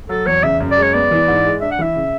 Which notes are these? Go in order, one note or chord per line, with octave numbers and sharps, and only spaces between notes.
F#3 A4
E2 C#5
C#3 E5
F#2
D5
G#3
C#5
B3 D5
E3
G#2
G#3
D4 E5
F#5
E3 E5
C#3